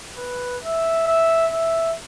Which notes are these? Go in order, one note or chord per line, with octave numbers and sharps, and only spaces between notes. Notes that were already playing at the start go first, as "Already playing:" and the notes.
B4
E5
E5
E5